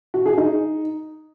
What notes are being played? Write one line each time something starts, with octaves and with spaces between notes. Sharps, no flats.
F#4
G#4
D#4